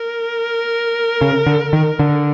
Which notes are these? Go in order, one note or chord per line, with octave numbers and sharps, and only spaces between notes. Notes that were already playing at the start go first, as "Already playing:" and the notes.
Already playing: A#4
C#3
D3
D#3
D3